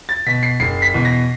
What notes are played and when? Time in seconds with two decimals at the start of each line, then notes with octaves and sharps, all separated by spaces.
0.09 A6
0.27 B2 B6
0.43 C7
0.60 F#1 C7
0.82 B6
0.94 E2 B2
1.05 A#6